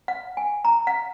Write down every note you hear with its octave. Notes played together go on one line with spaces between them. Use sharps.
F#5
G#5
A#5
F#5